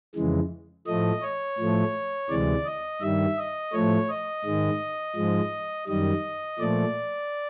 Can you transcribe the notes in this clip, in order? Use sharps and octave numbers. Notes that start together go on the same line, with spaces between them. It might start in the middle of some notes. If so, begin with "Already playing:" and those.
F2 C#3 E3 G#3
A2 F3 A3 D#5
C#5
A2 F3 A3
D2 C3 E3 G#3 D5
D#5
G2 D#3 G3 E5
D#5
A2 F3 A3 C#5
D#5
G#2 D#3 G#3
G#2 F3 G#3
F#2 D#3 G3 D#5
A#2 F3 A3 D5